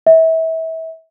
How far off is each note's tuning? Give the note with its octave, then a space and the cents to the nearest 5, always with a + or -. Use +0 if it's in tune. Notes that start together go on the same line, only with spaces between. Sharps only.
E5 -30